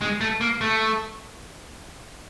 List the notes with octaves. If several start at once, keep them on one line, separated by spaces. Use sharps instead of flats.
G#3
A3
A#3
A3